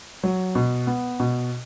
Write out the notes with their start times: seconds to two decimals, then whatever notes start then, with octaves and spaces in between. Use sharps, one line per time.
0.24 F#3
0.55 B2
0.87 B3
1.20 B2